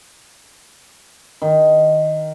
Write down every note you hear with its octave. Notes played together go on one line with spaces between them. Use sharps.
D#3